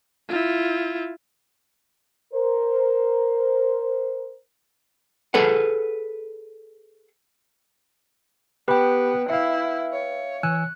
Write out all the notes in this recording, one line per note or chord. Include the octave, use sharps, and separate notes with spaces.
E4 F4
A#4 C5
G#4 A4 B4 F#5
B3 G4 B4 G5 B5
E4 E5 F5
C#5
E3 G#5 E6 F#6